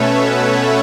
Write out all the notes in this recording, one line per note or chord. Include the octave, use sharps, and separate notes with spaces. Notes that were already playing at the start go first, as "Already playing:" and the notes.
Already playing: B2 A3 C#4 A4 B4 C#5 E5
C#5 F#5